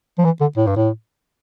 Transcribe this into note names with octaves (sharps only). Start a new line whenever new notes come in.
F3
E3
D3
A2
G2
A2